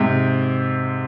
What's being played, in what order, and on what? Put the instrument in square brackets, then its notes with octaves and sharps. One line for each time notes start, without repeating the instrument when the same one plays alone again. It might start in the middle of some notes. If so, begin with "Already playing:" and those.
Already playing: [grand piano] G#2 C3